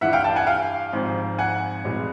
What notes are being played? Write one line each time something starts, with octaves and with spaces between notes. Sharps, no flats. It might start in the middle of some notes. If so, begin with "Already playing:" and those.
G2 E3 G3 E5 F#5
F5 G5
G5 A5
F#5 G#5
F5 G5
G#1 G#2 F3
F#5 G#5
F1 E2 B2 G#3